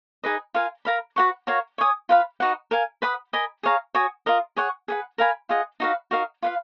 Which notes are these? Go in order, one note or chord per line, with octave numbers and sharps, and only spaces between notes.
D#4 G#4 B4 D#5
F4 A#4 F5 G#5
A#4 F5 B5
F#4 B4 F#5 C#6
F#4 A#4 C#5 F5
C#5 G#5 D#6
F4 B4 F5 B5
D#4 F#4 B4 F#5
A#4 F5 G#5
B4 F#5 B5 D#6
A#4 D#5 G#5 B5
G#4 C#5 F5 A#5
F#4 C#5 G#5 D#6
F4 A#4 D#5
G#4 C#5 F#5 C#6
G#4 B4 F#5
A#4 F5 G#5 B5
F4 G#4 D#5 F#5
D#4 F#4 B4 F5
D#4 F#4 A#4 F5
F4 B4 F5